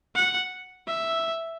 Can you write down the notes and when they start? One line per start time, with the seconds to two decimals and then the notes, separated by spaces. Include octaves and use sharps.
0.15 F#5
0.87 E5